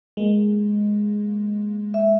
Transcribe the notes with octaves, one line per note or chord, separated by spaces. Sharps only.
G#3 A#3
E5